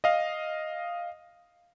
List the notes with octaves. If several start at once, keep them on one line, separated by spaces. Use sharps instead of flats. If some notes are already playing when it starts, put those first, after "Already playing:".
D#5 F5